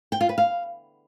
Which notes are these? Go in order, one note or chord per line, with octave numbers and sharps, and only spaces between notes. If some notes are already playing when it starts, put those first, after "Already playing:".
G5
F4
B4
F5